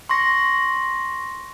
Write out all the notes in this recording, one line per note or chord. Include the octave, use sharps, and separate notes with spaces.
C6 C#6 A#6